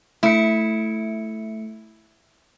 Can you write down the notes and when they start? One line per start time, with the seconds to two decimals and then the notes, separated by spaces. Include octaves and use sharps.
0.23 A3 E4 C#7